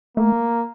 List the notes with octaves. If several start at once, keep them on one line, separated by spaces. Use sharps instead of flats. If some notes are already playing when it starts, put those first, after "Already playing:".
A3 A#3